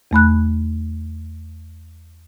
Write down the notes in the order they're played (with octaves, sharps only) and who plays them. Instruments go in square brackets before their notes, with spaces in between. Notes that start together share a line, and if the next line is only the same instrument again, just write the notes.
[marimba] E2 A3 B5 F#6